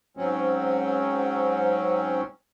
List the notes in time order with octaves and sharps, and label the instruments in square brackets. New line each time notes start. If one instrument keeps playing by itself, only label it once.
[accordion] G#2 F#3 C4 C#4